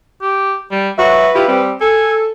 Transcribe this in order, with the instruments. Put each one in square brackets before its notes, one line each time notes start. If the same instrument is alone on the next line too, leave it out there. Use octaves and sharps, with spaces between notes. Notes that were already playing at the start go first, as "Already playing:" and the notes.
[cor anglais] G4
G3
[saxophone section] F#3 F#4 E5 [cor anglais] B4
[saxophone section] E4 F4 G4
G3 C4
[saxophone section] A4 [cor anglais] G#5